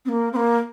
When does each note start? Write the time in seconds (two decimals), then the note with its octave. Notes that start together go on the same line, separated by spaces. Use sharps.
0.05 C4
0.09 A#3
0.33 C4
0.36 A#3